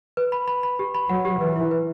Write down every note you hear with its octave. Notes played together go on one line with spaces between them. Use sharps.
B4
B5
B5
B5
G4
B5
F#3 F#5
G4
E3 B4
E4
B4